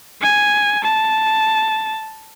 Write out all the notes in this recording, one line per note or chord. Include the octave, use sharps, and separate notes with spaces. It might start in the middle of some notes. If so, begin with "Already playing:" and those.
G#5
A5